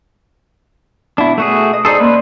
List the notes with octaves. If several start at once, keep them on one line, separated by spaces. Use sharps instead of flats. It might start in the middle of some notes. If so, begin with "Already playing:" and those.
B2 D4 E4
A3 F#4 G#4
D#5 D#6
D#4 G#4 A4 C5 D5
A#3 C#4 B4 C6